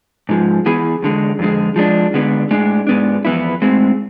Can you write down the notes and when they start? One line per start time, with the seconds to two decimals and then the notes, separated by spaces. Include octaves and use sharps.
0.29 G#2 F3 G#3
0.66 E3 B3 E4 G#4
1.02 E2 D3 G#3
1.39 F2 D3 G#3
1.76 F3 G#3 D4
2.14 D3 G#3 B3 D4
2.51 A2 G#3 D4
2.87 G#2 G#3 B3 D4
3.25 F2 E3 B3 E4
3.62 A2 G#3 C4